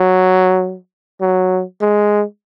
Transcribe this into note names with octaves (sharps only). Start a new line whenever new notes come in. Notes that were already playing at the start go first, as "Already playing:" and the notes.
Already playing: F#3
F#3
G#3